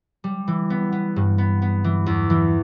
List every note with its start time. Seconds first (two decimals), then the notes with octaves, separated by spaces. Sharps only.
0.24 G3
0.48 E3
0.70 B3
0.92 B3
1.16 G2
1.38 B3
1.62 B3
1.84 E3
2.06 E2
2.30 E3